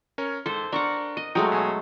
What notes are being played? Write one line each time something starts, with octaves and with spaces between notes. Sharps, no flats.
C#4 A#4 C#5
G#2 A4 C5
D4 A#4 F#5 C6 C#6
D#5 D#7
F#3 G#3 A3 G5 A#5 D#6
B1 G#5